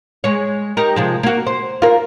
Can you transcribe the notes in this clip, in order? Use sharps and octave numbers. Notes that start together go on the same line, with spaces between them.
G#3 C#5
D#4 G4 A#4
C3 F3 G#3
A#3 F#4
C5
F4 A#4